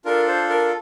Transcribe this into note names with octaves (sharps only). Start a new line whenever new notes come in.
D4 F4 A4 A#4
C5
A#4